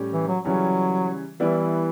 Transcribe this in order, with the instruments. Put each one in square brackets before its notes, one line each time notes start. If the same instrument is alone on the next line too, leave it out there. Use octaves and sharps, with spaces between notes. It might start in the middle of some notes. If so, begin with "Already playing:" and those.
Already playing: [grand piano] A2 G3 C#4 G4
[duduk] E3
F#3
[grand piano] C#3 E3 G3 C#4 [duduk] F#3
[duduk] E3 [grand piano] G3 B3 E4 B4 D5